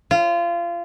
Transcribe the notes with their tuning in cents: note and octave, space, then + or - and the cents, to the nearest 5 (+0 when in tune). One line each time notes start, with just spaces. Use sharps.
F4 -25